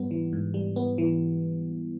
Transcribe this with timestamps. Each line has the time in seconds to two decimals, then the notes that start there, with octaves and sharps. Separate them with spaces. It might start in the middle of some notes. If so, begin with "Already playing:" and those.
Already playing: G#2 G3 B3
0.11 E3
0.33 G#2
0.54 G3
0.76 B3
0.98 E3